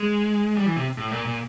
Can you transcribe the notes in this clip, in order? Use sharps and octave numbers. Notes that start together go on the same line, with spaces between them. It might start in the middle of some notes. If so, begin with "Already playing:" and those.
Already playing: G#3
G3
E3
C3
A2
A#2
A#2